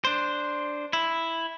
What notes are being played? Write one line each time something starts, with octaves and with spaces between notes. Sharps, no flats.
D4 C5
E4